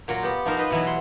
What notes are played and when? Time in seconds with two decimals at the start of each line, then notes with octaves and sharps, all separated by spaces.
0.08 A#2 F#3 F4 A#4 C6
0.23 B3 G4
0.46 F3 D#4 A#4 C5
0.57 D#4 B4 D#5
0.70 B2 E3 F#3
0.87 C6